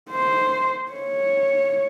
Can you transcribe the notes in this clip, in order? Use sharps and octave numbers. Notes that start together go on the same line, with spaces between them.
C5
C#5